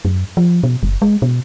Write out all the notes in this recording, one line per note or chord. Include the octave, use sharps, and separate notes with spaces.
F#2
F3
B2
F#1
G#3
B2